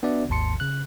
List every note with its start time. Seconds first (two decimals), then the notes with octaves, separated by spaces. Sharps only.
0.03 B3 D4 F#4 D5 E5 F#5
0.29 G#1 D#2 G#2 A5 C6 C#7
0.60 C#3 F#6